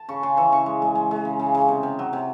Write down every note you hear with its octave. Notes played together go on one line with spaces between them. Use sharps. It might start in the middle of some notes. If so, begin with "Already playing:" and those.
Already playing: A5
C#3 C#6
C#3 C6
E3 C#6
C#3 C#6
G#3
G#3
G#3
G#3
C#3
C#3
C#3
C3
C3
F#3
C3